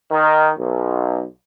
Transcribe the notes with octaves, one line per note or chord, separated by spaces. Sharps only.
D#3
B1